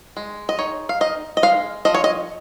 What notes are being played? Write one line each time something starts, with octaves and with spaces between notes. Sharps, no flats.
G#3
D#5
D#4 C#5
F5
D#4 D#5
D#5
G#3 F5
F3 D#5
C#5
D#5